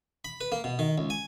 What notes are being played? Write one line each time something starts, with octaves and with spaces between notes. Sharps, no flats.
B5
B4
A#3
B2
D#3
C#2
G#5